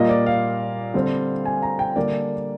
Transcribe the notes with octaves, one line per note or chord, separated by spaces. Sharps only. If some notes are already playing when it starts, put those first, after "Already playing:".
Already playing: A#2 G3 A#3 D#5
D5
F5
D3 G3 C4
G#5
A#5
G5
D3 G3 A#3 D4 D5